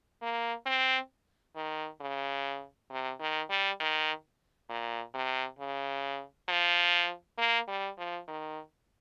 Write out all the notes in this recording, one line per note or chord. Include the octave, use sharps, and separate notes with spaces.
A#3
C4
D#3
C#3
C3
D#3
G3
D#3
A#2
C3
C#3
F3
A#3
G3
F3
D#3